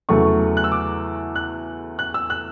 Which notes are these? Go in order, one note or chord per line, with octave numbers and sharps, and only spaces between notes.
E2 C#3 F#3 A3 C#6
F#6
E6
D6
F#6
F#6
E6
F#6